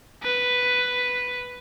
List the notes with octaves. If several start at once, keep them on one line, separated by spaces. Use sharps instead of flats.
B4